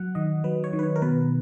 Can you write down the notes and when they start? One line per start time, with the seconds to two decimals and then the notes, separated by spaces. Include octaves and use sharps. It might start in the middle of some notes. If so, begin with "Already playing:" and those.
Already playing: F#3 F#5
0.15 D#3 D#5
0.44 F#3 B4
0.64 C#5
0.73 D#3
0.79 B4
0.83 C#5
0.96 A#4
1.02 B2 B4